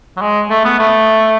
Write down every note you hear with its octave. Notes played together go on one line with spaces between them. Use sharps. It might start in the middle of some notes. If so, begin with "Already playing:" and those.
F#3
G#3
A3
B3
A3